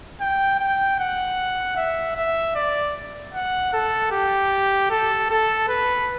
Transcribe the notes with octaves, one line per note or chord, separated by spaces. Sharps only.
G5
G5
F#5
E5
E5
D5
F#5
A4
G4
A4
A4
B4